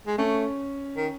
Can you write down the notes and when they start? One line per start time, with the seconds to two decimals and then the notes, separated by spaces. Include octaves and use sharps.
0.07 G#3
0.18 A3 C#4
0.97 D#3